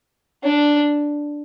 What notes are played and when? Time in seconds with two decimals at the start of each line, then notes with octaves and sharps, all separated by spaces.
0.43 D4